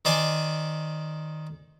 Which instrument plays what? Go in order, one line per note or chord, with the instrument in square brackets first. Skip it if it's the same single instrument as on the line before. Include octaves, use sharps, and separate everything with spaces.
[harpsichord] D#3 C5 D5 G#5